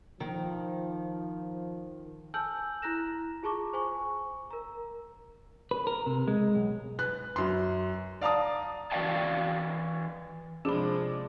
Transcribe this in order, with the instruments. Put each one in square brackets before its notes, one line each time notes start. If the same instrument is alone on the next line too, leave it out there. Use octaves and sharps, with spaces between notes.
[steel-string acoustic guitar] D#3 [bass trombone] F3
[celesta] G#5 A5 E6 F6 G6 F#7
E4 A#5 F#6 A#6 E7
F4 G#4 A5 A#5 C#6 D6
C5 G#5 C#6
A#4 A#5
[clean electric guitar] B4
A#4
C3
G#3
B1
[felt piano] B4 F#6
F#2 C6
D5 F5 A5 A#5 D#6
[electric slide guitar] E3 F#4 D5 F5 G5 A5
[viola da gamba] C3 G#3 [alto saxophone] F3 [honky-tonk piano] D4 [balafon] G#4 B5